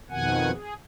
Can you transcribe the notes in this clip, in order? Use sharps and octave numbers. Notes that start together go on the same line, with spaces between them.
F2 B2 D#3 F#5 G#5
G#4